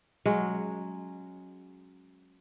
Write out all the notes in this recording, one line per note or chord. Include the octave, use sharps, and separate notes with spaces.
F#3 G#3 C#4